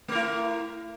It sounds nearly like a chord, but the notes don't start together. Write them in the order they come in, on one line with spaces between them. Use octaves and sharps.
A3 A#4 E4